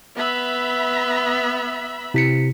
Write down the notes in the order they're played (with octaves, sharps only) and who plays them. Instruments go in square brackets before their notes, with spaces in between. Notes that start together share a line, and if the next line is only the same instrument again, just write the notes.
[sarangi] B3 [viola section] E5 B5
[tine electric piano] C3 [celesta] E4 B6 C#7